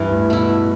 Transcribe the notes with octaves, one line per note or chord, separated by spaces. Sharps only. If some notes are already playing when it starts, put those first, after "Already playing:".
Already playing: G2 E3
A2
A2
B2 A3 E4
B2